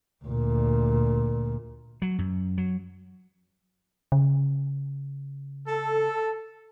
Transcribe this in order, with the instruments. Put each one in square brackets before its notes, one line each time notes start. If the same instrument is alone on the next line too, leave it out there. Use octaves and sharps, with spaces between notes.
[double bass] D2 A#2
[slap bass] F#3
F#2
F#3
[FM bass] C#3
[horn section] A4